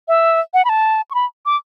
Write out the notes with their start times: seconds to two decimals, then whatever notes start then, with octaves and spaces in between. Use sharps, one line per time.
0.08 E5
0.54 F#5
0.65 B5
0.69 A5
1.11 C#6
1.15 B5
1.46 D6